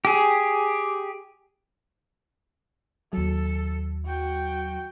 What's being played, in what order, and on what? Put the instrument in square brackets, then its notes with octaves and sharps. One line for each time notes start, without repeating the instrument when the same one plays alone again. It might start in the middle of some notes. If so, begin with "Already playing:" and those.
[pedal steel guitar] G4 G#4
[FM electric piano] D#2 F#3 [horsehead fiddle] A4
[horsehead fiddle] F#4 G5